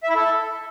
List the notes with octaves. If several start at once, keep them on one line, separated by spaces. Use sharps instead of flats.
E5
E4
A4